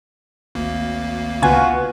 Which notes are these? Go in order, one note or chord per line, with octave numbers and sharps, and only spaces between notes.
G#1 D2 A#3
C#2 B3 F4 F#4 G#5